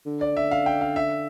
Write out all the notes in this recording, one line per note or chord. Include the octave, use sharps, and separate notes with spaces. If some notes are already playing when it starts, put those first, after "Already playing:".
D3
D5
E5
F5
G5
F5
E5